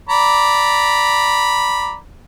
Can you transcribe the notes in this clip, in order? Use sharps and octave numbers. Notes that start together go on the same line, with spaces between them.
D5 A#5 B5